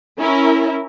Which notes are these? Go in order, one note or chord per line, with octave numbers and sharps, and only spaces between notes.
C#4 E4 A#4